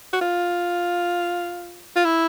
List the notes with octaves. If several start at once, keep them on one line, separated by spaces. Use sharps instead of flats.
F#4
F4
F4
E4